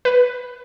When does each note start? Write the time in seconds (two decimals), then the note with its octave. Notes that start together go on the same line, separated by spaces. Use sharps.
0.05 B4